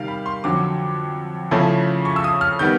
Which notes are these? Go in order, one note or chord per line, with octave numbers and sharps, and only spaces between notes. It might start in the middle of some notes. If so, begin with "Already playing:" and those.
Already playing: C3 D#3 G3 F5
B5
C6
F2 D3 F#3 D6
C#3 F3 A3 C#4 E4
C#6
E6
D#6
F6
D#3 G3 B3 G6